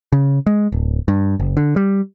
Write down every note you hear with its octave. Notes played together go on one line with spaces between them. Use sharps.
C#3
G#3
D1
G2
F#1
D3
G3